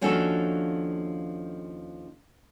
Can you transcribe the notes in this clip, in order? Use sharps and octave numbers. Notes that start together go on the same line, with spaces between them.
D#2 F3 C#4 D4 F#4 A4